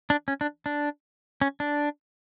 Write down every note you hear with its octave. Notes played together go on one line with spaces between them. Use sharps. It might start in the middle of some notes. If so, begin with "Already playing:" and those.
D4
C#4
D4
D4
C#4
D4